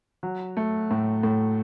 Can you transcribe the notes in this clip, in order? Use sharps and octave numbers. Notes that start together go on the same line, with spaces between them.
F#3
A3
A2
A2